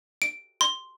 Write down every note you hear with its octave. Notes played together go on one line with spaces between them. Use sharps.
D7
C6